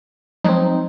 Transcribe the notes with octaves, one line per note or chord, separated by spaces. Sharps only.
F3 F#3 G#3 C4 D#4